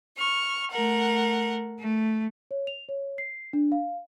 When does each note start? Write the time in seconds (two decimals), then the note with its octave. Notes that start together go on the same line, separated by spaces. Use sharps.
0.17 C#6 F6
0.71 A3 A#4 F#5
1.80 A3
2.51 C#5
2.67 F7
2.89 C#5
3.18 C7
3.53 D4
3.72 F5